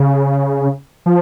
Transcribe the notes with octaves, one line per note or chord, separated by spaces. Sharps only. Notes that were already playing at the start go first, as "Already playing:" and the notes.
Already playing: C#3
F3